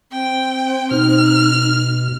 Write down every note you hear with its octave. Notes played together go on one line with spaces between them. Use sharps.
C4 G5
B2 D#4 F6